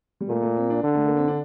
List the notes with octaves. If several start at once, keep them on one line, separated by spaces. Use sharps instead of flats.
G3
A#2 A3
A3
C4
D4
D3
A3
A#3
C4
D4